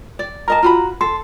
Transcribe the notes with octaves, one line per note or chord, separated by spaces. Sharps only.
D5
A#4 D#5 A5 A#5
F4 F#4 B5
A4 C6